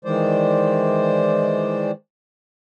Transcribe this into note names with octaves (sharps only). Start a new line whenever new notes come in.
D#3 E3 G#3 C5 D5